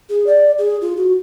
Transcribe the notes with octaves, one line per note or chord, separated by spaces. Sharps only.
G#4
D5
G#4
F4
F#4